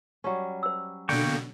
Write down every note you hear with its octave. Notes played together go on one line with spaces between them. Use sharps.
F#3 G3 C#4
C5 E6
B2 D3 A#3 G5 C#6